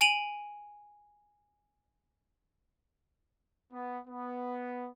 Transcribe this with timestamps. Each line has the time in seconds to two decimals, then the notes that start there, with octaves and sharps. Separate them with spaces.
0.01 G#5 D7 D#7 F7 F#7
3.73 B3
4.08 B3